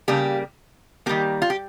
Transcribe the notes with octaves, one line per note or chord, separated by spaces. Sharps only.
C#3 G3 A#3 G4
D#3 G3 A#3 G4
F4
G4